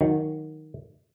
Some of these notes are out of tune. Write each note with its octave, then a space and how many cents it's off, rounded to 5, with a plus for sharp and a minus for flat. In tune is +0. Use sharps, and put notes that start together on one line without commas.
D#3 +0 F#3 -20